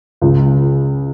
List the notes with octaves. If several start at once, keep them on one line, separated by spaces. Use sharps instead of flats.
C#2